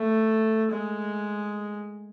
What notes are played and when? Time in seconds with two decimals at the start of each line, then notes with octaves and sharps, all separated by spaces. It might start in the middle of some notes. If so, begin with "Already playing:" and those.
Already playing: A3
0.71 G#3